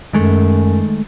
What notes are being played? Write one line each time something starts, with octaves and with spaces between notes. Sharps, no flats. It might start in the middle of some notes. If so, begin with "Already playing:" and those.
F#2 D#3 G#3 A3